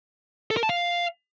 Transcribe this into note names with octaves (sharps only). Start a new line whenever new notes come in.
A4
A#4
A5
F5